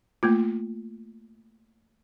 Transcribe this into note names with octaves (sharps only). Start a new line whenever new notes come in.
A3 A#3 F4